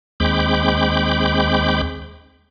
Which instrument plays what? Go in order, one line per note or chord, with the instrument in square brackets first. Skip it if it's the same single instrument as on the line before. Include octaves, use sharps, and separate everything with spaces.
[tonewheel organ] D#2 G#3 C4 B5 D6 G6